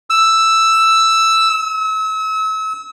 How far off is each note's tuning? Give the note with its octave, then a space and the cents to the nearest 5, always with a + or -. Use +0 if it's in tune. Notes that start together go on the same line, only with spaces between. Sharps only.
E6 +5
E6 -35